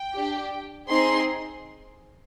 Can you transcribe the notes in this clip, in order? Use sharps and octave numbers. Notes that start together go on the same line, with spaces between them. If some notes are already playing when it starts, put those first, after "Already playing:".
Already playing: G5
D4 G4
C4 D#4 G#4 C6